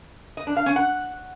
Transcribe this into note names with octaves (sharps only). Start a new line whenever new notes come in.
D#5
D4
F5
C#4
F#5